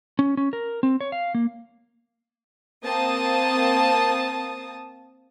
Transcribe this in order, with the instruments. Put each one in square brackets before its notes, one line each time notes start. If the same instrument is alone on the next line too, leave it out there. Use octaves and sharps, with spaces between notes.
[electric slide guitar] C#4
C#4
A#4
C4
C#5
F5
A#3
[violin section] A#3 C4 A5 D#6